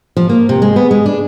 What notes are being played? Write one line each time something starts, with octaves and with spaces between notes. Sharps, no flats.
F3
A#3
C3
G#3
B3
G#3
D4